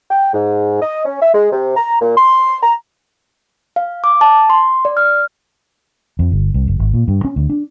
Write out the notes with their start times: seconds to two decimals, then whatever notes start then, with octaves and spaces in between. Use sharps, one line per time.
0.11 G5
0.34 G#2
0.82 D#5
1.05 C#4
1.22 E5
1.34 G#3
1.52 C3
1.77 A#5
2.01 A#2
2.17 C6
2.62 A#5
3.76 F5
4.04 D6
4.21 A5
4.50 C6
4.85 D5
4.97 F6
6.19 F2
6.32 G1
6.54 C2
6.68 F#1
6.79 G#1
6.94 A#2
7.08 G2
7.24 C#4
7.36 D2
7.50 D4